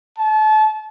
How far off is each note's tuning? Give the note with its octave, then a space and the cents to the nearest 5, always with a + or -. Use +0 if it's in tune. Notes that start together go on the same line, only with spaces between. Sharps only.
A5 -30